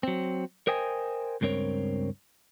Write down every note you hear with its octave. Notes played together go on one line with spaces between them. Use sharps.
F#3 C4
A#4 C5 D#5 G5 G#5
C#2 G2 C4 A#4 C#5